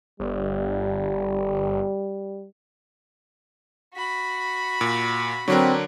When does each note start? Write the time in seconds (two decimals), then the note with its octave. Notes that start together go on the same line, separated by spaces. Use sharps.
0.20 G1 G3
3.94 F#4 B5
4.81 A#2
5.48 D3 F#3 C4 D4 A#4